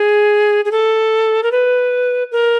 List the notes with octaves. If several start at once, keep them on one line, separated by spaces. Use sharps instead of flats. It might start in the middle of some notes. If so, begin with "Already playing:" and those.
Already playing: G#4
G#4
A4
A#4
B4
A#4